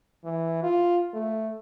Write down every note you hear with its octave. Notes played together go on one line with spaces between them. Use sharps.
E3
F4
A3